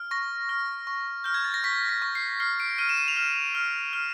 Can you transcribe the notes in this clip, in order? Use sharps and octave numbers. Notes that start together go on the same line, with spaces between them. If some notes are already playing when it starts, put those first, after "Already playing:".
Already playing: F6
C#6 A#6
F6
C#6
F6 G6
G#6
A6
A#6
C#6 B6
B6
C#6
C7
F6 C7
D7
F6 D#7
E7
D#7
F7
F6 E7
F6
F6